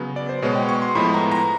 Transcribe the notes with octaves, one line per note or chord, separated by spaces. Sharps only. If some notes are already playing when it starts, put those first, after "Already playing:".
Already playing: C#3 F#3 B3
D5
C5
B2 G#3 B3 C#5
G5
C#6
C6
A2 F3 G#3 B3 B5
A#5
A#5